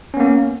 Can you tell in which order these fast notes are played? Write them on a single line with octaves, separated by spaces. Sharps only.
C#4 B3 A#3